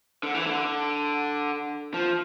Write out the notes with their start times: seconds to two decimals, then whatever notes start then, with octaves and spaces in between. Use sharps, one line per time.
0.23 D3
0.34 E3
0.47 D3
1.94 F3